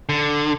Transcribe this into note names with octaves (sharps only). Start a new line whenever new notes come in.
D3